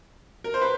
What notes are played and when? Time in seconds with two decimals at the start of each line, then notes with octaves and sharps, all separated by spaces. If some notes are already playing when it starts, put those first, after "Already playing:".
0.44 A#4
0.54 C5
0.62 B4